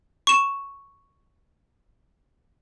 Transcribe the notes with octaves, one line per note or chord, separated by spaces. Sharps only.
C#6 E7